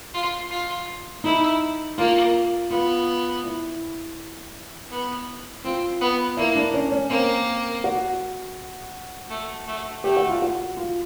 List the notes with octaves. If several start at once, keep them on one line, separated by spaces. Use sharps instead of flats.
F4
F4
D#4 E4
A#3 F4
B3 F4
E4
B3
C4 F4
B3
A#3 E4
D4
C#4
C#4
A#3 C4
F#4
A3
A3
A3 G4
F#4
F4
F#4
F4